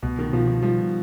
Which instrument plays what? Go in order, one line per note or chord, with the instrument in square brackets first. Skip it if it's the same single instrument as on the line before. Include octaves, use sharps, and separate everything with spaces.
[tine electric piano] C2 [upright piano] B2
[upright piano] D#3
[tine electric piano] B2 [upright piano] F3
[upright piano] D#3
[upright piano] F3 [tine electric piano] G3